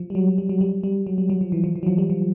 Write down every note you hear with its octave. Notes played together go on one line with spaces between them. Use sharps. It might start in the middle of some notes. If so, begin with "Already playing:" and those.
Already playing: F3
G3
F#3
G3
F#3
G3
G3
F#3
G3
F#3
F3
E3
F3
E3
F#3
F3
G3
F3